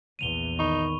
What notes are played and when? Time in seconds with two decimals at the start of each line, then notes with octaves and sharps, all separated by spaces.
0.19 A#1 E2 E3 D#7 F7 G7
0.59 D#3 D#4 B5 C#6